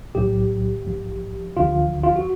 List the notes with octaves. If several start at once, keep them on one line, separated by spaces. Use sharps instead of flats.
B1 A2 F#3 G4
A#1 G#2 F3
D2 D3 F3 F4
F4
F#4